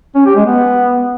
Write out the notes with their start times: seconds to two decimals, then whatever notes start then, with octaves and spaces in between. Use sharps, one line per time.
0.15 C#4
0.26 G4
0.36 G#3
0.46 B3